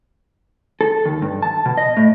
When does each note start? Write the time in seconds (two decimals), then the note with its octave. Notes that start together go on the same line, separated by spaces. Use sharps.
0.81 A4
1.05 D#2
1.22 G2
1.43 A5
1.66 B2
1.77 D#5
1.97 A2